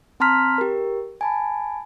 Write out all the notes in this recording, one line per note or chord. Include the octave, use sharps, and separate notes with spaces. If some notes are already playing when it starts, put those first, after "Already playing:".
C4 A5 A#5 C6 F6 B6
G4 A#4
G#5 A5 B5